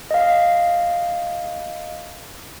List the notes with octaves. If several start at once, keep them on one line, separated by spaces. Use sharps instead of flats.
D#5 F5